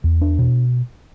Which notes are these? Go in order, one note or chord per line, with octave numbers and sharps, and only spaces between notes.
E2
D4
B2